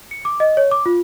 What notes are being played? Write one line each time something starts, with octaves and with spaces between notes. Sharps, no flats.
C#7
D6
D#5
C#5
D6
F4